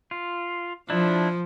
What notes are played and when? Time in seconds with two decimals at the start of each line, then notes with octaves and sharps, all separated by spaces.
0.11 F4
0.90 F3 D4 E4